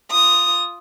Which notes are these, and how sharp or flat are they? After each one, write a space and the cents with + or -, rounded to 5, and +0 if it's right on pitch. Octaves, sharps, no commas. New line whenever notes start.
F4 +0 D#6 +0